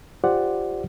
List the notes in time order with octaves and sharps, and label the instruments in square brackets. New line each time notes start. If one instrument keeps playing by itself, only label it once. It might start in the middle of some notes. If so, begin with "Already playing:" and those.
[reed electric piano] F4 G4 C5 D5 F#5